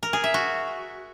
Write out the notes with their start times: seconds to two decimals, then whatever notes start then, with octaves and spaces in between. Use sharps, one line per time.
0.03 A#4
0.13 G#4
0.24 E5
0.34 F#4